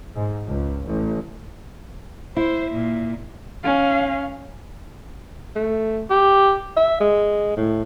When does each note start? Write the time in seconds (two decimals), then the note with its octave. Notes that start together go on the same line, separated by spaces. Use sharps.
0.14 G#2
0.47 C#2
0.86 A1
2.37 E4 C5
2.71 A#2
3.64 C#4 F5
5.56 A3
6.10 G4
6.76 E5
7.00 G#3
7.57 A2